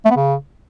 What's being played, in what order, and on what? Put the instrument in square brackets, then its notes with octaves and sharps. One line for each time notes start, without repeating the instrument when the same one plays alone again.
[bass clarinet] A3
B3
C#3